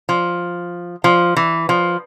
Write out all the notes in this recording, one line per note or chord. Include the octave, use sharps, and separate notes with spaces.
F3
F3
E3
F3